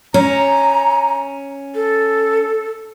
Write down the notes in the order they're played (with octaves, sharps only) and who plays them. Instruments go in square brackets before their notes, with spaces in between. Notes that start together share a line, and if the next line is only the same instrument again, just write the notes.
[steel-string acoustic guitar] C#4 [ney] A#5
[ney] A4